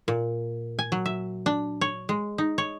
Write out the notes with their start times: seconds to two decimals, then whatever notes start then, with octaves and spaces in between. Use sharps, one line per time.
0.08 A#2
0.79 G#5
0.92 F#3
1.06 E5
1.46 D4
1.81 C#5
2.09 G#3
2.38 D#4
2.58 C#5